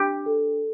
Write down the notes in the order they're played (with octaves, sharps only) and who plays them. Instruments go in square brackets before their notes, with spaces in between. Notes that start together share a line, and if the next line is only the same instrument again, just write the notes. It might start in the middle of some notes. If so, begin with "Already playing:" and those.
Already playing: [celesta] D4 [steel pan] G4
[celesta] A4